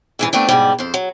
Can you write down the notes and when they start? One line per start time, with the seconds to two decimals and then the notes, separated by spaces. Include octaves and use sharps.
0.19 E2 G#2 E3
0.33 A3 B3 C4 D4
0.49 G#2 B2 G3
0.78 F2 C5
0.94 F#3